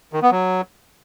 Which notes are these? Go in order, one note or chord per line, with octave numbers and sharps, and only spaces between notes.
D#3
B3
F#3